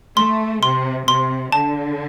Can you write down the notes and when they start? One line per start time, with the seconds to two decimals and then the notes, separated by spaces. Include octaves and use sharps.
0.17 A3 C6
0.63 C3 C6
1.08 C3 C6
1.52 D3 A5